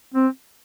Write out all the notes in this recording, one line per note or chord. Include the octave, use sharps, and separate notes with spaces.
C4